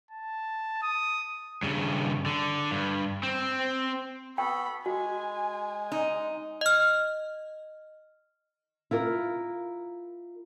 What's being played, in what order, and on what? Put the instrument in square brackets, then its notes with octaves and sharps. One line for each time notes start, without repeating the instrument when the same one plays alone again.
[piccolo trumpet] A5
D#6
[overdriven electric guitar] G2 C#3
D3
G2
C4
[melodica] B3 F#4 A4 [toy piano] G5 [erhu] B5
[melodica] G#3 [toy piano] F#4 [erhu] G#5
[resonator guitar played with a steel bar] D#4
[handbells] D#5 F6
[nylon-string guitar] E4 F4 A#4